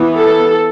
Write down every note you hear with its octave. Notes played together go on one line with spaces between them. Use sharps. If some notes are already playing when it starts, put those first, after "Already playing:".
Already playing: E3 B3
A4